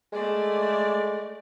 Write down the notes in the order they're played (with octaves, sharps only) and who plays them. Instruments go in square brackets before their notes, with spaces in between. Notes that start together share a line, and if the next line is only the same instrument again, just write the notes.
[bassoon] G#3 [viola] A3 D5